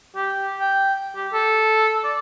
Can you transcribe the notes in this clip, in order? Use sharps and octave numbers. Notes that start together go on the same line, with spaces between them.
G4
G5
G4
A4
D5